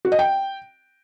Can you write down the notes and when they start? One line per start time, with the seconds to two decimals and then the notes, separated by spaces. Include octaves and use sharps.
0.05 F#4
0.12 D#5
0.19 G5